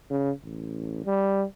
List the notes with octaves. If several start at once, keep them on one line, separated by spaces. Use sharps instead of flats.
C#3
A1
G3